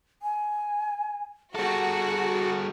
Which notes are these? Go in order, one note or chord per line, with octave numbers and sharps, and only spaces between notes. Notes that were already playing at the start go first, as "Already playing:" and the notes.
G#5
G3 F#4 G#4 A4